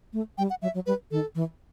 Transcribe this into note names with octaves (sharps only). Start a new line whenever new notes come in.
A3
G3 G5
F#5
F#3 E5
F#3
G3 B4
D#3 A4
E3